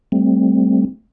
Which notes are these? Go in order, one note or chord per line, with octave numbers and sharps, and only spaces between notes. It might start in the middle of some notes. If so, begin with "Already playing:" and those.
G3 A3 C4